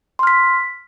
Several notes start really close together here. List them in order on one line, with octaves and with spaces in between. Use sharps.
C6 F6 B6